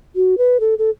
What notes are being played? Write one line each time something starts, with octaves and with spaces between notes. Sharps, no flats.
F#4
B4
A4
A4